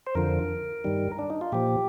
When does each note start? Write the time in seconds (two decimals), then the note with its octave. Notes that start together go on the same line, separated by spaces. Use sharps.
0.07 C5
0.15 F2 D3 F3 A#4
0.84 G2 D#3 G3
1.19 D4
1.30 D#4
1.41 F4
1.52 A#2 F3 G4